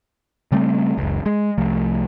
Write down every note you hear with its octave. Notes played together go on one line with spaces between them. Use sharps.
C#3 G3 A3 C4
F#1 C#2
G#3
C2 F3 A3